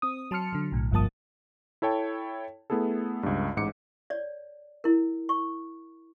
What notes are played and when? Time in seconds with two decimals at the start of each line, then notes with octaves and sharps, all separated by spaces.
0.02 C4 D#6
0.31 F#3 A5 C6 F6 C#7
0.53 D3 F#3
0.72 B1 A2
0.91 G1 G2 F3 A#3 A5 D#6
1.82 E4 A4 C#5 G5 A5
2.70 A3 B3 E4 G#4 A4
3.23 C#2 G2
3.56 A1 G#2 D6 C#7
4.10 C#5 D5
4.84 E4 A#4
5.29 C#6